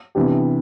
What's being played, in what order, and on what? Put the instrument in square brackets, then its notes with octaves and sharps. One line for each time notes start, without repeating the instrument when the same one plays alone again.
[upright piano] C3 E3 B3 D4 G4